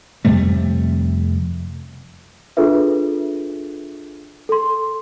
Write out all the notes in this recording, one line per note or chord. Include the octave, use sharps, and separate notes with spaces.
F2 C3 G3 A3
D4 F4 G#4 A4 B4 E5
A4 C6